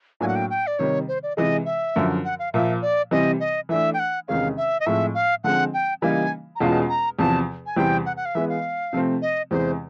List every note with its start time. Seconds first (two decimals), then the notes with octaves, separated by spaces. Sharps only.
0.20 A2 F#3 A#3 D4 G#5
0.28 F#5
0.36 G5
0.50 G5
0.67 D5
0.79 C3 D#3 G3 C#5
1.08 C5
1.23 D5
1.37 C3 E3 G#3 D#5
1.66 E5
1.96 F#2 D3 F3
2.24 F#5
2.39 F5
2.53 A#2 F3 A#3 E5
2.82 D5
3.11 C3 E3 G3 C4 D#5
3.40 D#5
3.69 E3 A3 D4 E5
3.94 G5
3.99 F#5
4.28 E2 C3 D#3 G#3 C#4 F5
4.57 E5
4.80 D#5
4.86 A2 F3 G#3 C4 E5
5.14 F5
5.44 D3 F3 G#3 C4 F#5
5.74 G5
6.02 C#3 E3 G3 A#3 D#4 G#5
6.56 A#5
6.60 E2 B2 G#3 C#4 F4 A5
6.89 A#5
7.18 E2 C3 F3 A5
7.66 G#5
7.76 E2 C3 E3 G3 C4 G5
8.06 F#5
8.17 F#5
8.25 F5
8.35 E3 G#3 B3 E5
8.49 F5
8.93 C3 F3 A3 C4
9.22 D#5
9.51 E2 C3 E3 G#3 C5